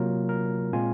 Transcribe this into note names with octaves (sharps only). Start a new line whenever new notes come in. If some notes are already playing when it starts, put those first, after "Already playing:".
Already playing: C3 F#3 A#3 F4 A#4
A#4
A#2 G#3 C4 F4 G#5